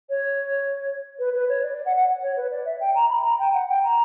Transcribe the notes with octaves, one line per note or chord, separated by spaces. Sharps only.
C#5
B4
B4
C#5
D5
D5
F#5
F#5
C#5
B4
D5
E5
G5
A#5
B5
A#5
G5
F#5
G5
A#5